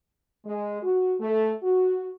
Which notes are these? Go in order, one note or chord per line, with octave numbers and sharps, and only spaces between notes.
G#3
F#4
A3
F#4